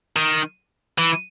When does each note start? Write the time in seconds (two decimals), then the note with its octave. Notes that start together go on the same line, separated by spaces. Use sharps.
0.17 D#3
0.99 E3